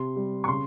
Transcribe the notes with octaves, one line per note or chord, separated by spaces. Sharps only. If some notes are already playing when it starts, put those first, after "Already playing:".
Already playing: C3 C6
G3
C#6
C#3 C6